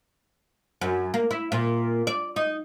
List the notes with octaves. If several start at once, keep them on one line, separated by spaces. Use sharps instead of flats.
F#2
A#3
E4
A#2
D5
D#4